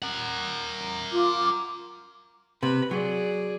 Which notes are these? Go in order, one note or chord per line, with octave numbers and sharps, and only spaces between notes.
A#4 F#5
F4 D6
C3 B4 B5
F#3 G#4 D5